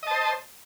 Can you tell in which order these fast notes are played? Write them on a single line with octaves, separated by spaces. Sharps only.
D#5 A5 C5